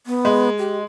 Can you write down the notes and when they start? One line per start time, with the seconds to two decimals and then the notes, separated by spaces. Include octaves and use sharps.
0.06 B3
0.25 G#3
0.59 G4